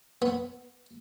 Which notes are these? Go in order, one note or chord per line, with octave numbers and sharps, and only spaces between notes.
B3